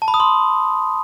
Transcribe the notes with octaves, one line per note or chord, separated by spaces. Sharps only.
A5
B5
D#6
C6